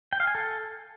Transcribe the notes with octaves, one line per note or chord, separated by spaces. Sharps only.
G5
F5
G#5
A4